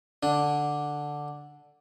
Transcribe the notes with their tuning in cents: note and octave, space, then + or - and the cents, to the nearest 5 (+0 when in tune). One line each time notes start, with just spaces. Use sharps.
D3 +0 D4 +0